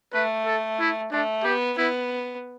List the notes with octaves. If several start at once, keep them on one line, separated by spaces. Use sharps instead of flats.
A3 B4
A4
E4
A3 D4
B3 G4
B3 E4